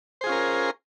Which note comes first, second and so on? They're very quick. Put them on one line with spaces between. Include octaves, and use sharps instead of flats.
C5 G#4 F4 C#4 A#4